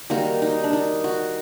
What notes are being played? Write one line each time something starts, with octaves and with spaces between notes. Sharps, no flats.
D#3 G3 A#3 F#4
D#4
D4
D#4
F#4